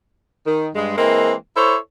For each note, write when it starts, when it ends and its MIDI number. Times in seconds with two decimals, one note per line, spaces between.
0.46 0.68 51
0.75 0.97 43
0.75 0.97 56
0.97 1.33 52
0.97 1.33 56
0.97 1.33 58
0.97 1.33 60
1.56 1.75 64
1.56 1.75 69
1.56 1.75 72
1.56 1.75 73